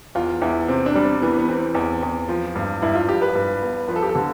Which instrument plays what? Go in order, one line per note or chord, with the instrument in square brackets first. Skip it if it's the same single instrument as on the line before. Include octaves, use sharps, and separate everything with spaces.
[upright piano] E2 [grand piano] F4
[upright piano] E2 [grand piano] E4
[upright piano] C3 [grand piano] C4
[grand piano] D4
[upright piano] G3
[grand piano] C4
[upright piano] E3 [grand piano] B3
[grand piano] B3
[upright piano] E3 [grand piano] C4
[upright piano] E2
E2
F3
G2
[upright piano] G2 [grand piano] E4
[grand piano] F4
[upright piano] F3 [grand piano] G4
[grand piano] B4
[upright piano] G2
B3
[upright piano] F3 [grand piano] B4
[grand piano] A4
G4
A4
[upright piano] D3